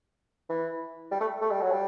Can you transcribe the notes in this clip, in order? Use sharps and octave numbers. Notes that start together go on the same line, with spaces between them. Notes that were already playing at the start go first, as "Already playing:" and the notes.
E3
G3
A3
A3
G3
F#3
G3